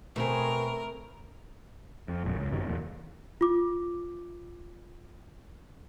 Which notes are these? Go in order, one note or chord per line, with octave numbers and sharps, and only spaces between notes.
B2 A3 C4 G#4 A#4
F2
E1 A#1 F#2
C#2
G#1 F#2 C3 D#3
D1 E2 A#2
F4 D6